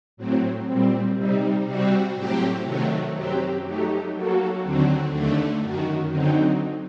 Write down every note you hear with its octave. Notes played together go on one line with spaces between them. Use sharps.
A2 F#3 C4
A#2 G3 C4
C3 G3 C4 D#4
C3 G3 C4 F#4
A2 F#3 C4 G4
C3 D#3 F#3 A3
F#2 F#3 C4 G4
F#3 A3 D#4 G4
F#3 A#3 F#4 A4
D#2 D3 F#3 C4
D#2 D3 A3
F#2 D#3 F#3
D3 F#3 C4 D#4